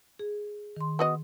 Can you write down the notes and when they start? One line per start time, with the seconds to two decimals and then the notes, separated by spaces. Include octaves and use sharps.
0.19 G#4
0.76 D#3 C6
0.99 B3 F#4 D#5